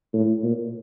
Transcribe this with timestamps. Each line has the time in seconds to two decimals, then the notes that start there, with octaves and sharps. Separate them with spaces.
0.14 A2
0.43 A#2